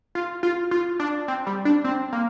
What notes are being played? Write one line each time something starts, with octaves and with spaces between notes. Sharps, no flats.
F4
F4
F4
D4
C4
G3
D4
C4
A#3